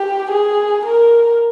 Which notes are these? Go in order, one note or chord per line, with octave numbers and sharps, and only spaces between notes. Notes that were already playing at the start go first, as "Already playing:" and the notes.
Already playing: G4
G#4
A#4